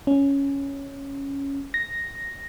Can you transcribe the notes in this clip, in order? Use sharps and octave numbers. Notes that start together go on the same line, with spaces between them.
C#4
A#6